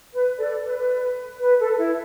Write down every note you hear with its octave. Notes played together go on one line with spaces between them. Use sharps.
B4
A4 D5
B4
B4
A4
E4